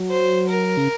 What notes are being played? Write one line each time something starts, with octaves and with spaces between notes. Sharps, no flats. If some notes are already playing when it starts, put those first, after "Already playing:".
Already playing: F#3
C5
A#4
C#3